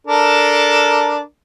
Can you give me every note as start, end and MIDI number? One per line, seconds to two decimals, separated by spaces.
0.07 1.20 62
0.07 1.20 69
0.07 1.20 70